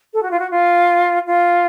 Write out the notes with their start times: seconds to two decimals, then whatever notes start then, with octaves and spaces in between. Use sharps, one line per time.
0.14 A4
0.23 F#4
0.31 F4
0.39 F#4
0.51 F4
1.27 F4